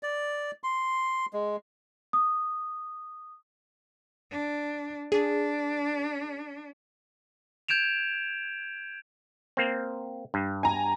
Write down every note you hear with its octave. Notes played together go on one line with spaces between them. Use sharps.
D5
C6
G#3
D#6
D4
D4 G#4
G6 G#6 D7 E7 F7
A#3 C4
G2
G#5 A#5